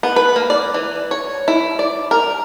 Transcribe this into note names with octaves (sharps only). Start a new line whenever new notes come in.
B3
B4
A#3
D5
E3
C#5
E4
D5
A#4